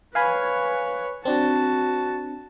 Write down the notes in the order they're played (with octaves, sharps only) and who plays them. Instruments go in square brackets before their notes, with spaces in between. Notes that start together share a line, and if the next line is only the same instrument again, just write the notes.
[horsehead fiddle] B4 C#5 [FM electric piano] F5 G#5 B5
[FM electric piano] C4 D4 [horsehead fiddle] F#4 A5